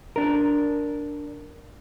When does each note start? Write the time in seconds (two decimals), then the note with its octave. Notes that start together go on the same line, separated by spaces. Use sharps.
0.16 D4 A#4